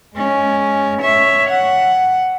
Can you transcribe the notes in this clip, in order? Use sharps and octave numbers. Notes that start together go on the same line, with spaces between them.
G#3 C#4
C#5 E5
F#5